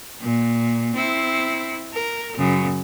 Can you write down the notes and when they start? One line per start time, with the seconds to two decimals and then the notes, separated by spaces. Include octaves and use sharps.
0.21 A#2
0.95 C4 E4
1.93 A#4
2.37 F#2 C#3